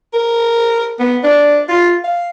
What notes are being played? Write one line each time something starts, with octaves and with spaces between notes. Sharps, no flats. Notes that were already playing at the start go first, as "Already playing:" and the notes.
A#4
B3
D4
F4
F5